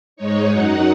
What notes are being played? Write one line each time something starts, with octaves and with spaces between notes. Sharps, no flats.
G#2 G#3 D#4 C#5
F#2 F#3 D#4 F#5